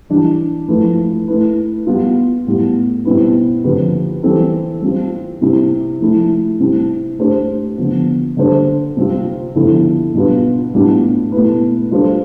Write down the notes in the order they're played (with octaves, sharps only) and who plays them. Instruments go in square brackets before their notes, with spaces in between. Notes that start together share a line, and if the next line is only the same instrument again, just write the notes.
[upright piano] E3 G3 D4
F3 A3 E4 B4
A3 E4 B4
G3 B3 F4
A2 G3 B3
B2 G3 C4 E4 B4
D3 F3 C4 G4 B4
E3 G3 C4 E4 A4
G3 C4 F4
C3 G3 C4 E4
F3 A3 E4
C3 G3 C4 E4
A3 D4 G4 C5
D3 F3 B3
D3 G3 D4 A4 C5
C3 G3 C4 F4
D3 F3 B3 E4 A4
B2 G3 D4 F4 B4
A2 G3 B3 D4 F4
B2 A3 E4 B4
G3 D4 F4 A4 C5